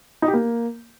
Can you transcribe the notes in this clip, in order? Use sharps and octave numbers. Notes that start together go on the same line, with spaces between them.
D#4
G4
A#3